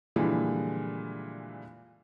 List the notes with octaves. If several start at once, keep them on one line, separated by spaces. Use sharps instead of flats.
A#2 D3 E3 F3 G3 G#3